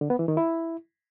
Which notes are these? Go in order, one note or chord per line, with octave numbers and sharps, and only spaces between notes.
D3
B3
E3
D#3
E4